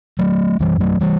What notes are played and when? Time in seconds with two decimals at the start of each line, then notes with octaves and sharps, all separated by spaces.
0.19 F#3 A3
0.60 F#2 E3 G3
0.80 F#3 A3
1.01 E3 G3